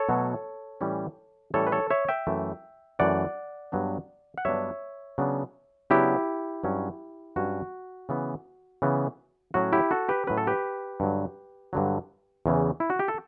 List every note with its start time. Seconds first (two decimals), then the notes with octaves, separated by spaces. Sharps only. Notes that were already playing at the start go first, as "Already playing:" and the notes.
Already playing: A4 C#5
0.09 B2 F#3 A3
0.81 A2 E3 G3 C#4
1.54 A2 E3 G3 C#4 A4 C#5
1.67 B4
1.72 A4 C#5
1.91 C#5 E5
2.09 E5 G5
2.27 F#2 E3 A3
2.99 F#2 E3 A3 D5 F#5
3.72 G2 F#3 B3 D4
4.38 F#5
4.45 G2 F#3 B3 D4 C#5 E5
5.18 C#3 F#3 B3 D4
5.90 C#3 F#3 B3 D4 E4 G4
6.64 G2 F#3 C#4
7.36 G2 F#3 C#4 F#4
8.09 C#3 E3 B3
8.82 C#3 E3 B3
9.54 A2 F#3 C#4 F#4
9.73 E4 G4
9.91 F#4 A4
10.09 G4 B4
10.27 A2 F#3 C#4 B4
10.37 A4
10.47 G4 B4
11.00 G2 D3 F#3
11.73 G2 D3 F#3
12.46 E2 C#3 E3
12.80 E4
12.90 F#4
12.99 G4
13.08 A4